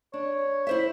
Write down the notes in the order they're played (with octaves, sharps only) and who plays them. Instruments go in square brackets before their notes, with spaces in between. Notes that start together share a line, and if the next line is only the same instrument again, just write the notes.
[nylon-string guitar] D4 [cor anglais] C#5
[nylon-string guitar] E4 C5 E5